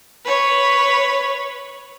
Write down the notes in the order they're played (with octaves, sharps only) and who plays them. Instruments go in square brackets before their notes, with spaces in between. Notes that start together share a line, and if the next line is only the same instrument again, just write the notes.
[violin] B4 C#5